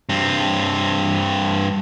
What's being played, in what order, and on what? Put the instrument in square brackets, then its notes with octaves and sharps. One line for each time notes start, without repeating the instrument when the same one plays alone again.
[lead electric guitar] G2 C4